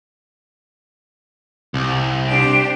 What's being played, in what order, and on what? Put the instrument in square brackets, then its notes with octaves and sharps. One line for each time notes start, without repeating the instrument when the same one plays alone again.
[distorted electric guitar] C2
[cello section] D4 G4 C5